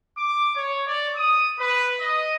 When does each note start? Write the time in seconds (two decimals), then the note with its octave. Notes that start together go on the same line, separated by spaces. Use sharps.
0.18 D6
0.56 C#5
0.87 D5
1.16 D#6
1.60 B4
2.00 D#5